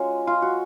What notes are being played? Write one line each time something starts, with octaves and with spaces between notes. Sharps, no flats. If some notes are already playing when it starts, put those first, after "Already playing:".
Already playing: G#3 C#4 F4 F#4
F4
F#4